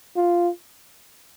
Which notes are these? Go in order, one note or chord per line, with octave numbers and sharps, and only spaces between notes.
F4